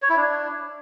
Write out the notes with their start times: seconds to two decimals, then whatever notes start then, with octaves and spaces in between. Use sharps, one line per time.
0.02 C#5
0.09 E4
0.17 D4